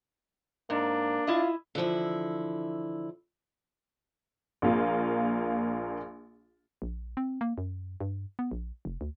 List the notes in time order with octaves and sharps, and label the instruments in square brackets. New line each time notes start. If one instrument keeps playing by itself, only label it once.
[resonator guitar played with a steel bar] G#2 [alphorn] A#3 [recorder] D4
[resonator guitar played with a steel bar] E4 D#5 [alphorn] F4
[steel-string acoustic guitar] D3 E3 F3 E4
[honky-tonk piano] A#1 A#3 F4
[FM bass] A#1
C4
A#3
F#2
G2
B3
A#1
F1
D2